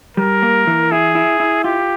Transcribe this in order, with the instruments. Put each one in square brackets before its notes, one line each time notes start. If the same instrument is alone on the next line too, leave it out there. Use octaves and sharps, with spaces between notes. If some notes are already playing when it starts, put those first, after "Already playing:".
[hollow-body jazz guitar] G3 [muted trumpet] A#4
[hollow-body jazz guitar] A#3
E3
[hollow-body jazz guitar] E4 [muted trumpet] G#4
[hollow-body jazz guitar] E4
E4
[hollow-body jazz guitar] F4 [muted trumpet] G4